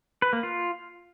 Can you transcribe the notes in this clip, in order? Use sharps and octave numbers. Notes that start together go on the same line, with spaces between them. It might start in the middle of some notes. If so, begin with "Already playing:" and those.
B4
A#3
F4